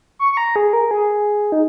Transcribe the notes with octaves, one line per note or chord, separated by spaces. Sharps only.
C#6
C#6
A#5
G#4
A#4
G#4
D#4